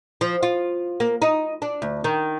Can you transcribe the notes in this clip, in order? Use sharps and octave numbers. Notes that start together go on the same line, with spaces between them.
F3
F4
A#3
D#4
D4
D2
D#3